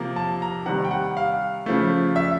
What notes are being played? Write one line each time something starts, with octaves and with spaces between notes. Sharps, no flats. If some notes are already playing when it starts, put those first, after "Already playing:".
Already playing: C3 F3 A#3
A5
A#5
C3 D#3 G3 F#5
G5
F#5
F5
C#3 F3 A3
E5